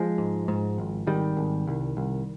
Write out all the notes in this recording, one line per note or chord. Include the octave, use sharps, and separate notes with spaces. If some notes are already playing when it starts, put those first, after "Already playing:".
Already playing: F3 G#3
G#2
G#2
G#1
G#1 D#3 G3
G#1
C2
C2